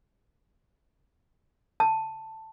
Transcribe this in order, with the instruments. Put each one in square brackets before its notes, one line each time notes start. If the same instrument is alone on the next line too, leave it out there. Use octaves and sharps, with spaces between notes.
[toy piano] A5